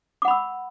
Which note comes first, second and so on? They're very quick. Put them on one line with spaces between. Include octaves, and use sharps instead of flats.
D6 F#5 B5 E6